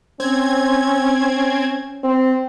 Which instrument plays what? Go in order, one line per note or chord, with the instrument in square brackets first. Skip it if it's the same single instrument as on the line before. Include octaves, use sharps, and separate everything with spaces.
[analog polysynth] C4 G#6 [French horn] C#4
[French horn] C4